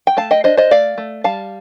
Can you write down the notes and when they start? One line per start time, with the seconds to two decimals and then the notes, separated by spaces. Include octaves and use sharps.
0.07 G5
0.17 A3 F5 A5
0.31 D#5 G5
0.44 D4 C5 D#5
0.57 C5 D#5
0.71 A3 D5 F5
0.98 A3
1.24 G3 F5 A5